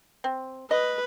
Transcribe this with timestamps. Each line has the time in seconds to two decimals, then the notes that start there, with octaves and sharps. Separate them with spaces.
0.24 C4
0.71 B4 D#5